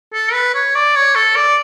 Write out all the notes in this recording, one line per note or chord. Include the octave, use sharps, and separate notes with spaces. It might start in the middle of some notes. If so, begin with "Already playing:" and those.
A4
B4
C#5
D5
C#5
A4
D5